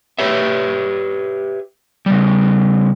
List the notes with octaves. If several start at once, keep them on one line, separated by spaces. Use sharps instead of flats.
G4 B4 C#5 E5
C#3 G3